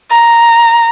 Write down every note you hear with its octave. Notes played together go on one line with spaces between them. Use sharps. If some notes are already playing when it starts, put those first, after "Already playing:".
A#5